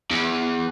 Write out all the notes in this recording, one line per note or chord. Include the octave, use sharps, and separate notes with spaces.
E2